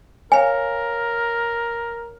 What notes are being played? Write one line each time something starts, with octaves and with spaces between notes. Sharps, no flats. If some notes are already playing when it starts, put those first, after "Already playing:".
A#4 C#5 F5 G#5